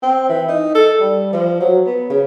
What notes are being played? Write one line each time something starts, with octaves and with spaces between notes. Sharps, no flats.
C4
E3
D#4
A4
G3
F3
F#3
B3
C#3